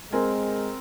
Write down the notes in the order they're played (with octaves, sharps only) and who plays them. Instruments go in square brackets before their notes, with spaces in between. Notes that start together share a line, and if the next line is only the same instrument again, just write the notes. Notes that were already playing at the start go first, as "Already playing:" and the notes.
[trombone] G#3 [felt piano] C4 A#4 G#5